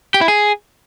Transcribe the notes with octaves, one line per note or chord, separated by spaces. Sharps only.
G4
E4
G#4